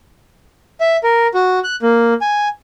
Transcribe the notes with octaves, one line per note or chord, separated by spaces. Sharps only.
E5
A#4
F#4
F#6
A#3
G#5